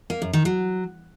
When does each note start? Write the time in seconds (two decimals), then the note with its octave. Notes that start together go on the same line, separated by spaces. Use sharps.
0.10 A#3
0.22 F#2
0.33 D#3
0.45 F#3